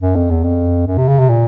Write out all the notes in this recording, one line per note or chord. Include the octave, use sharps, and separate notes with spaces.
F#2
F2
E2
F2
F#2
C3
C#3
C3
A#2